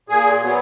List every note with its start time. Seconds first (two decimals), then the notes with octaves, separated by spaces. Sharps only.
0.09 A#2 G#4
0.42 F#3 B3